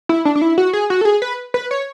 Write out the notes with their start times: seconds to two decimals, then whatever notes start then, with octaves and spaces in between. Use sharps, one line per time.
0.09 E4
0.25 D4
0.35 D4
0.42 E4
0.58 F#4
0.73 G#4
0.90 F#4
1.01 A4
1.05 G#4
1.22 B4
1.54 B4
1.71 C#5